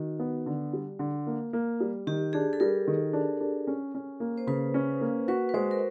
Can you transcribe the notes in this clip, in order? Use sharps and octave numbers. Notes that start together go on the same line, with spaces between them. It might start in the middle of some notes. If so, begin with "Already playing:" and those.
Already playing: D#3 F#4
B3
D3
G3
D3
A#3
A#3
G3
D#3 G4
D4 G#4
A4
G3 A#4
D#3
D4
D4
C#4
C#4
A#3
C5
C#3 B4
C#4
A#3
F#4 B4
B4
G#3 C5
A#4